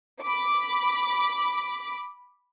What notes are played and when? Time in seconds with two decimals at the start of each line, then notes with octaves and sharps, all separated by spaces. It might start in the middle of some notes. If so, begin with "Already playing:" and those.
0.22 B5 D6